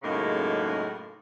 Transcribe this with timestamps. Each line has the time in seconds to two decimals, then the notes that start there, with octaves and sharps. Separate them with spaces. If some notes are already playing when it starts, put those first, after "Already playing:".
0.03 F#2 A2 C#3 G#3 A#3 D#4